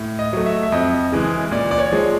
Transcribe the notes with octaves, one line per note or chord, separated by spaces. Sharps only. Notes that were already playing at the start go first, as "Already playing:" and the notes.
Already playing: A2
D#5
F#3 A3
E5
E5
F2 D#5
C#3 E3 G#3
A#2 D5
D5
C#5
F3 G#3